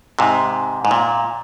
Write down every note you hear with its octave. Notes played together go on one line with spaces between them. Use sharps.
G#2 C3
G#2
A#2